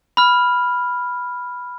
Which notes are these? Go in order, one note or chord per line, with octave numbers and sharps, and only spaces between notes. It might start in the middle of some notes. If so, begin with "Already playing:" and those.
B5 F6